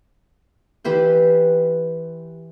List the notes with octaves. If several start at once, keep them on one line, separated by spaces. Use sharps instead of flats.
E3 G4 B4 C5